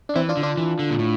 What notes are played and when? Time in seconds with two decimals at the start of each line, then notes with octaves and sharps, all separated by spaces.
0.09 D4
0.15 E3 C4 E4
0.29 D4 F4
0.37 D3
0.43 D4 F4
0.57 E3
0.79 D3
0.90 A#2
0.99 A2